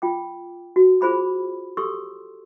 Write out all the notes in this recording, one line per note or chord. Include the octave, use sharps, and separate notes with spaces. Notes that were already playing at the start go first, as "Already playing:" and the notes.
F4 G5 D6
F#4
F4 G#4 C5 B5 D6
G4 A4 C6 C#6 E6